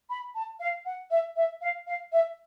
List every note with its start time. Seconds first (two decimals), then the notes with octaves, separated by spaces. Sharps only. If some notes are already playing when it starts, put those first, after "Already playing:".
0.10 B5
0.35 A5
0.60 F5
0.85 F#5
1.10 E5
1.36 E5
1.61 F5
1.87 F5
2.12 E5